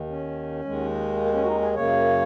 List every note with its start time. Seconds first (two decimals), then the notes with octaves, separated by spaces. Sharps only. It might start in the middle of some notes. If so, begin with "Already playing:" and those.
Already playing: D#2 D#3
0.09 C#4
0.65 D#2 D#3 G#3
1.20 A#3
1.33 C#4
1.43 F#4
1.47 D#4
1.61 G#4
1.75 F#2 C#3 A#3 C#5